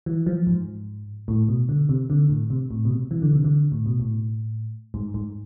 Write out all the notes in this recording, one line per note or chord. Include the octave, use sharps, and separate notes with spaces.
E3
F3
G#2
A2
B2
D3
C3
D3
A2
C3
A2
B2
C3
E3
D3
C3
D3
A2
B2
A2
G#2
G#2